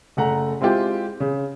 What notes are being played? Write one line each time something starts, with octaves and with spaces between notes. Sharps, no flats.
F#1 A3 F#5 A#5
G#3 C4 E4 F4 G4 G#4
C#3